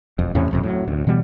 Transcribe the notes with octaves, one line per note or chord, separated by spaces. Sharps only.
E1 F2
E2 A2 C3 C#4
D#1 F2 C3
A2 F#3
D2
B2 E3 G3 B3